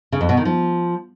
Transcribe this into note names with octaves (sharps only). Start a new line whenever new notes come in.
C#3
F2
B2
D#3
F3